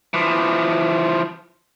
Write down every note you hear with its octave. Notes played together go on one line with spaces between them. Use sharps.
E3 F3